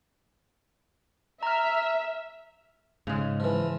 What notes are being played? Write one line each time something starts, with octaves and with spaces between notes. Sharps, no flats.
E5 A#5 F6
G#2 C#3 G#3
E3 F3